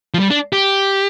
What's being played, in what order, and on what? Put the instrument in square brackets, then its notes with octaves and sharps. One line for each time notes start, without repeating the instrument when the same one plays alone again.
[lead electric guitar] F3
G3
D4
G4